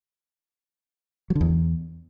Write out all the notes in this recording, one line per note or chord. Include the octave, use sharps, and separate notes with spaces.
F#3
D3
E2